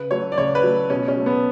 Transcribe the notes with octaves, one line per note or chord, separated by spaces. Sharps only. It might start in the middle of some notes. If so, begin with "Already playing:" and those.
Already playing: C#3 B4
F#3 A3 C#5
D5
C#3 C#5
B4
F#3 A3
B2 C#4
C#4
F#3 A3
B3